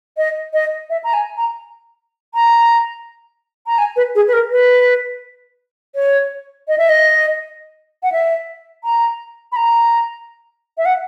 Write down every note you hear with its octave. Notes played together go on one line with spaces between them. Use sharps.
D#5
D#5
E5
A#5
G#5
A#5
A#5
A#5
G#5
B4
G#4
B4
A#4
B4
C#5
D#5
E5
D#5
F#5
E5
A#5
B5
A#5
E5
F#5